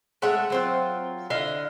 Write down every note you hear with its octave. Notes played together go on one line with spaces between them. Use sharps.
G#3 A3 E5 F#5
F#3 C4 F4
D3 E4 D#5 F5